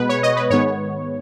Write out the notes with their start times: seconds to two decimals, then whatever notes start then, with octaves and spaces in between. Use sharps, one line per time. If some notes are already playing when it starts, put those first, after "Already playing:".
Already playing: B2 G#3 B3 B4
0.09 C#5
0.23 D#5
0.37 B4
0.50 G#2 D#3 G#3 B3 C#5